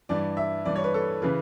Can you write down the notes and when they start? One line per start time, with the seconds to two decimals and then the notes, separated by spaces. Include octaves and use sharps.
0.09 G2 E3 D5
0.37 E5
0.65 G2 E3 D5
0.76 C#5
0.84 B4
0.94 A4
1.22 C#3 E3 B4